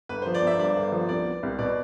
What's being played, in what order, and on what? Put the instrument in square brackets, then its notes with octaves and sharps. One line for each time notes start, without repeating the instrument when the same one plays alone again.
[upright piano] G1 [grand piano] B4
[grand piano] C5
[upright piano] F3
[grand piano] D5
[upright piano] G1 [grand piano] E5
[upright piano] G2 [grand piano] D5
[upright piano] G1
F3
[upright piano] C2 [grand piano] D5
[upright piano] B3
C2
[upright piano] B2 [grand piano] D5